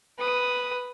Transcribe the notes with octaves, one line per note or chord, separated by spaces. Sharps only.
B4 D#6